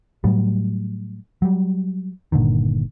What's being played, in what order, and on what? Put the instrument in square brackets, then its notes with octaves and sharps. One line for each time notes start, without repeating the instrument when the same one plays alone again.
[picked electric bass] A2 F#3 G3
F#3 G3
G1 A#2 D3 D#3